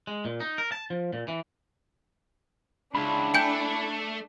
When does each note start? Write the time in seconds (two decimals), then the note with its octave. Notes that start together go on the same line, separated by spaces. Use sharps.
0.07 G#3
0.25 A#2
0.40 D#4
0.58 A#4
0.72 A5
0.90 F3
1.13 A#2
1.28 E3
2.95 C#2 D4 E4 B5
3.34 A3 G5 G#5 G6